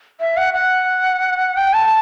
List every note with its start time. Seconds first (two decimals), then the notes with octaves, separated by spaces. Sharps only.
0.20 E5
0.37 F#5
0.54 F#5
1.57 G5
1.73 A5